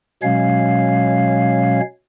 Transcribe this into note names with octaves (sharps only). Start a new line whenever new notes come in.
B2 F#3 G#3 C#4 C#5 F5